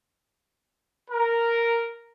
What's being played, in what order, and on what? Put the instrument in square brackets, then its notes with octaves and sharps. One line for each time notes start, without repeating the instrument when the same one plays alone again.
[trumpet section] A#4